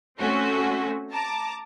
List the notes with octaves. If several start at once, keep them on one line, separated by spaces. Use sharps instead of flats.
A3 C4 C#4 F#4
A5 A#5 D6